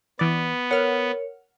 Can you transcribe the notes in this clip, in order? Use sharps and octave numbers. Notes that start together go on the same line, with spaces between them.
E3 B3 D5
A#4 C#5 F#5 F6 C#7